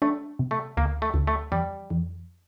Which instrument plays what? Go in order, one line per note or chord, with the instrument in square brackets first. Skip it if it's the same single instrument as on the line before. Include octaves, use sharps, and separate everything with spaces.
[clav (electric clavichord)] A3 [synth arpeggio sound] D4
[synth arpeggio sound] C3
[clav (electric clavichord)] A3
[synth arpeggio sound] D2 [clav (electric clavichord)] A#3
[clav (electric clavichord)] A3
[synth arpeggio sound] D2
[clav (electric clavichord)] A3
[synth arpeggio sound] F2 [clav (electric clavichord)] G3
[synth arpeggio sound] F2